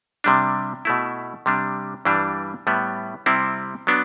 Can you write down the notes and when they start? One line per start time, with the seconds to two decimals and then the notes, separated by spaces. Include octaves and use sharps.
0.24 C3 G3 D4
0.85 B2 A3 E4
1.46 C3 G3 D4
2.05 G2 E3 G3 D4
2.67 A2 G3 B3
3.26 C3 G3 C4 E4
3.87 F#3 B3 D4